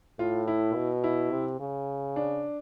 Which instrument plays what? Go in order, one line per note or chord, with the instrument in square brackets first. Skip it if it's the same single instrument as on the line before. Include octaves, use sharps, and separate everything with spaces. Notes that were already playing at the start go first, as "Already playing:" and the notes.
[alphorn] A2 [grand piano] F4
[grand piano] E4
[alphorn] B2
[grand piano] E4
[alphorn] C3
C#3
[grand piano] D4